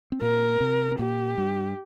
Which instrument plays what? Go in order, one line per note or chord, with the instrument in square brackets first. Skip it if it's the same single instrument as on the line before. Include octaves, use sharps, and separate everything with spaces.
[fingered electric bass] C4
[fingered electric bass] A#2 A#3 [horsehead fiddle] A#4
[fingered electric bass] C3 C4
C4
[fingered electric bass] A#2 A#3 [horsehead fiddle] G4
[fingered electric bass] G2 G3